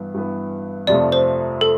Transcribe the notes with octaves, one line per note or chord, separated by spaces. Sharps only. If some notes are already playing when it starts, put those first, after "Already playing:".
Already playing: G2 E3 B3
G2 E3 B3
F2 C3 F3 A3 D5
C5
A4